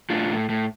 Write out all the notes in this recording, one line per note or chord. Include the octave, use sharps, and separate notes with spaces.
A2 D4 F4
A2
A2